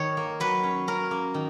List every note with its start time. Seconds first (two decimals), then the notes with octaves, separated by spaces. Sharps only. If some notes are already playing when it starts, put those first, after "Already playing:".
Already playing: D#3 C#5
0.17 A#3
0.40 F#3 B4
0.63 C#4
0.87 C#4 A#4
1.11 A#3
1.34 D#3